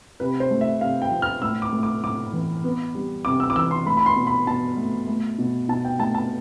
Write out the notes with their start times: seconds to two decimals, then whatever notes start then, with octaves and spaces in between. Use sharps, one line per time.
0.20 C3 B4
0.40 C5
0.51 A3
0.61 E5
0.81 C3 F5
1.02 G5
1.11 F3
1.22 F6
1.42 A2 E6
1.62 D6
1.72 A3
1.83 D6
2.04 A2 D6
2.33 E3
2.64 B3
2.95 G3
3.25 C3 D6
3.40 E6
3.50 D6
3.56 E3 E6
3.71 C6
3.86 A3 B5
3.97 B5
4.06 C6
4.16 B2
4.27 B5
4.47 B2 A5
4.77 A3
5.08 A3
5.38 B2
5.69 B2 A5
5.85 G5
5.99 A3 A5
6.14 A5